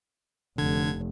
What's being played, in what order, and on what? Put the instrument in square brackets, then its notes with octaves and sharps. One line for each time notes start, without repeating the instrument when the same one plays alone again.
[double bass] F1 [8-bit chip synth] D3 G#6